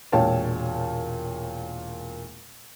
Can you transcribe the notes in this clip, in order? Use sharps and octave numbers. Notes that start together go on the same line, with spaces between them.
E1 A#2 C#5 F5 G5 A5